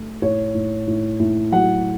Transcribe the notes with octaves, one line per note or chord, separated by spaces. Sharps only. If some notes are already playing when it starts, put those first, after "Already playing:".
Already playing: A3
A2 C#5
A2
A2
A2
F#3 F#5